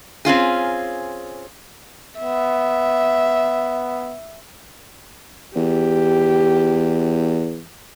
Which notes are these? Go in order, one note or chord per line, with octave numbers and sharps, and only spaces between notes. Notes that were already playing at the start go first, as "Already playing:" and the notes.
C4 C#4 F4 G#4
B3 E5
E2 G4